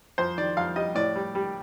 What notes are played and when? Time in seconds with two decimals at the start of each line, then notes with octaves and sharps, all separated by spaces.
0.18 F2 C5
0.38 D#3 D5
0.57 F2 F5
0.76 G3 D#5
0.95 A2 D5
1.15 G3
1.35 G3